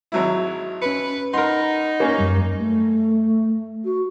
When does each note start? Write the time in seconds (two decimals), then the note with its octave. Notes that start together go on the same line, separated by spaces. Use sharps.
0.12 G#1 F#3 E4
0.82 C#4 B4 C#7
1.33 D#4 A#4 F#5 B5 C6
2.00 A#3 C#4
2.19 F#2 G3
2.58 A3
3.84 F#4